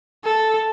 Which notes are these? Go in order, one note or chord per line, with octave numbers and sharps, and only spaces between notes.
A4